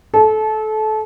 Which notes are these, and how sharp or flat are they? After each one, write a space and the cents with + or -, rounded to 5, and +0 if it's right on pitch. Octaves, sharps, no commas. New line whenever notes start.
A4 -25